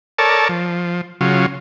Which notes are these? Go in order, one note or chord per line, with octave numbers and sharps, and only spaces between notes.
A4 A#4 C#5 D5 A5
F3
C#3 F#3 F4